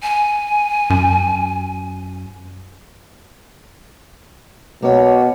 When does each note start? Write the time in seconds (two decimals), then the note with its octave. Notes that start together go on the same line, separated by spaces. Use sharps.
0.03 G#5
0.90 F#2
4.82 B2 A#3 C#5